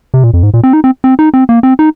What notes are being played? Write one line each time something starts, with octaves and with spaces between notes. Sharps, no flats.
C3
A#2
F2
G#2
A#2
C4
D#4
C4
C4
D#4
C4
A#3
C4
D#4